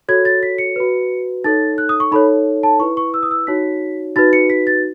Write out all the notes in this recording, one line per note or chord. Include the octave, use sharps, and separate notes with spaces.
F#4 A4 C#5 G#6
A6
B6
C#7
F#4 B4
D#4 A4 C#5 A6
F#6
D#6
C#6
D#4 A4 C#5 B5
A5
E4 B4 C#6
C#6
E6
D#6
E6
D#4 F#4 C#5 B6
D#4 F#4 B4 A6
C#7
B6
A6